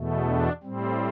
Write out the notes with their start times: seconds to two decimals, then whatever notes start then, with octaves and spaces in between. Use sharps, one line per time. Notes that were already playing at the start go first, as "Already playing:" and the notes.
Already playing: E2 B2 A3
0.27 D4
0.63 A2 G3 C4